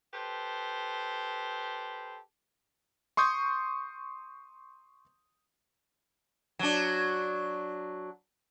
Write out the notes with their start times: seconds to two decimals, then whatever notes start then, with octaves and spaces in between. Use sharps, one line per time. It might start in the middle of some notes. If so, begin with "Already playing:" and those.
0.14 G4 A4 B4 C5
3.17 C6 C#6 D#6 G6
6.59 F#3 D4